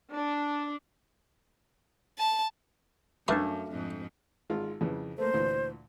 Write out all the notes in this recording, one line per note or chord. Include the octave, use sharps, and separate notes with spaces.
D4
A5
F#2 E3 G3 A3 D4 D#4 F5 D6
F2 G#2
G#1 G#3 F4
F2 C#3 E3
A3 A#3 C5
D2 A#2 E3